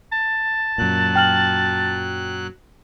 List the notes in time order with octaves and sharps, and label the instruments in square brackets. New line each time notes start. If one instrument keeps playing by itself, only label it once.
[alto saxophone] A5
[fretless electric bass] F#2 A#2 [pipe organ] F#3 F#6
[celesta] G5 F6 F#7